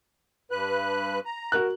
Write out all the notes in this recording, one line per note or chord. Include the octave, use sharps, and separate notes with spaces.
G2 B4 F#6
A#5
F#4 A#4 F#6